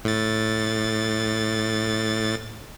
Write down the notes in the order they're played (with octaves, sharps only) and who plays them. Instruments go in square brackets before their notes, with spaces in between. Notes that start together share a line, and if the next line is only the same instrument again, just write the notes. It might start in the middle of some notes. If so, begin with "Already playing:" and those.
[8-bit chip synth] A2 A6